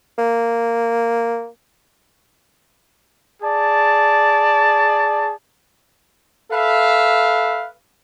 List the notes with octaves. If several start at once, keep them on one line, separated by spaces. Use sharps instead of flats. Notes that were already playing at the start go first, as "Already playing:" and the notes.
A#3
G#4 D5 A5
A4 B4 E5 F5